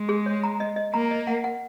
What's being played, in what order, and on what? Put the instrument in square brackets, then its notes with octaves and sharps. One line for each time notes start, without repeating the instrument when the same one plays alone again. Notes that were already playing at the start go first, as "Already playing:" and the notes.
Already playing: [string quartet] G#3
[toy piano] G#4
C#5
A#5
D#5
D#5
[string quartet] A#3 [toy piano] A#5
[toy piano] D#5
F#5
F#5